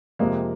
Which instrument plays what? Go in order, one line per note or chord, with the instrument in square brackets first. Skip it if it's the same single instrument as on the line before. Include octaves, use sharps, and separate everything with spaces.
[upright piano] F2 C3 F3 G#3 A#3